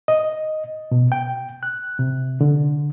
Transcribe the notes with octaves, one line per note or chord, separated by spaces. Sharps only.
D#5
B2
G5
F#6
C3
D3